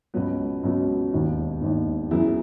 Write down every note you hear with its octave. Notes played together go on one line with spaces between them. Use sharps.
C#2 B2 F#3 B3
C#2 B2 F#3 B3
E1 D#2 D#3
E1 D#2 D#3
F#2 E3 B3 E4 G#4